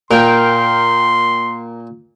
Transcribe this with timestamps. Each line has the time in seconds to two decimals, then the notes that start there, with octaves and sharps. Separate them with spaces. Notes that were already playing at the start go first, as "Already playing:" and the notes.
0.11 A#2 A#4 G5 C6